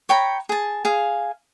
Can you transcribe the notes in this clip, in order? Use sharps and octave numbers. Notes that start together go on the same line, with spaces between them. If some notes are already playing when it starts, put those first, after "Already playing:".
C#5 G5 A#5 B5
G#4 A5
G#4 F5